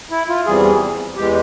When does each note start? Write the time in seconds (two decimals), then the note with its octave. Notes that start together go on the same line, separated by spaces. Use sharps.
0.11 E4
0.29 F4
0.46 E2 C3 E3 G3 G#4
1.16 E2 E3 G#3 G4